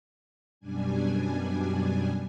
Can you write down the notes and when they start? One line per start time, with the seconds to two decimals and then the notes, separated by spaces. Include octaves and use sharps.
0.60 F#2 B2 G3 D4 G#5